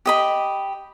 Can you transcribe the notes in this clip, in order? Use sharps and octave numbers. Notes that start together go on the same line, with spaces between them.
G4 D#5 B5